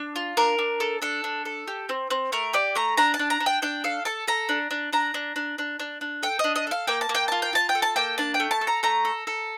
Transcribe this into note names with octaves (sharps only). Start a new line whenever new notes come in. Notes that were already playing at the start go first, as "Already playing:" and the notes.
Already playing: D4
F4
D4 A#4
D4
A4
D4 A4
D4
A4
G4
C4
C4
A3 A#4
G4 D5
A3 A#5
D4 A#5
A5
D4
A#5
D4
G5
D4 G5
A4 F5
A4 A5
A4 A#5
D4
D4
D4 A#5
D4
D4
D4
D4
D4
A4 G5
D4 D#5
D#5
A4 F5
A#3 G5
A5
A#3
G5
F4 A5
G5
F4 A5
G5
A4
A5
A#3 G5
D4 A5
G5
A3
A5
A4
A#5
A3 A#5
A4
A4